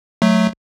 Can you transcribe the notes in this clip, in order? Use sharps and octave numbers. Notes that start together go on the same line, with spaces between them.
F#3 A3